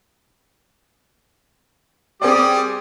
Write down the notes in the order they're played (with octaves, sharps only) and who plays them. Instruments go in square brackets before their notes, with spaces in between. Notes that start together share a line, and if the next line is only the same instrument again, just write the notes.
[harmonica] G3 G4 D#6 [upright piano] C4 G#4 D5